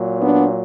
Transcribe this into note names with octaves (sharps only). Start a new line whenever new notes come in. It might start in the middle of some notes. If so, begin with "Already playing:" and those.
Already playing: A#2 F#3
B3 D4